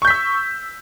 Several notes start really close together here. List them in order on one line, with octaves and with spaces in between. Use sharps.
C#6 G6 B6 E6